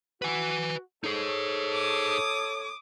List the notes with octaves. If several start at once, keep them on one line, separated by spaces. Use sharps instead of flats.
F#4 B4 G#5
D#4 G#4 A4 C#5
D6 D#6